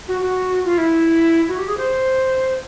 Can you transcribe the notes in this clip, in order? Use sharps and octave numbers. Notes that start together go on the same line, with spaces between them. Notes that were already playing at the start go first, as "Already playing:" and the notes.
F#4
F#4
F4
E4
F#4
G4
G#4
C5